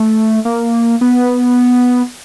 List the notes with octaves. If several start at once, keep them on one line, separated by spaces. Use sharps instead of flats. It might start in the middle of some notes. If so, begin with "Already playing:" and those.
Already playing: A3
A#3
B3